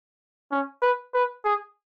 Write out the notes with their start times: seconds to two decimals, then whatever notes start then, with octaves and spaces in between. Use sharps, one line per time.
0.51 C#4
0.82 B4
1.14 B4
1.45 G#4